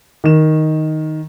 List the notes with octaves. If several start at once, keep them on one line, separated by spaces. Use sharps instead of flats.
D#3 E7